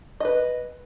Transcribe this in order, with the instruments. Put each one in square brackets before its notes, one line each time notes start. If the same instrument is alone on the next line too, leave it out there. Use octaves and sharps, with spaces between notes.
[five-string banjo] B4 D#5